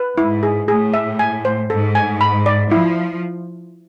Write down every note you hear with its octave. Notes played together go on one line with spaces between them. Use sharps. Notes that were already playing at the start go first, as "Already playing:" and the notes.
Already playing: B4
G#2 E4
G#4
A2 G#4
E5
G#5
C5
G#2 A4
G#5
B5
D5
F3 E4